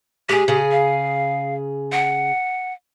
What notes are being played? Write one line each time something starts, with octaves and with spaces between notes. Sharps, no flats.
G#3 G4 G#4
C#3 G#4
F5
F#5